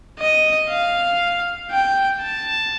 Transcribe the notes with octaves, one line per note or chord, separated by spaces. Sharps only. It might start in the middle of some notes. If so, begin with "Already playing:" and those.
D#5
F5
G5
A5